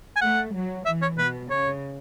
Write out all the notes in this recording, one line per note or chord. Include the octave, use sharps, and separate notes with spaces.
G#5
A3 F#5
F#3
E3 E5
C#5
B2 B4
C#3 C#5